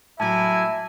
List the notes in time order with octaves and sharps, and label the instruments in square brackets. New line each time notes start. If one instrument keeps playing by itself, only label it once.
[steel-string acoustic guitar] A2 F#3 [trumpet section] A#3 E4 G#5 [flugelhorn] E5 [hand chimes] A5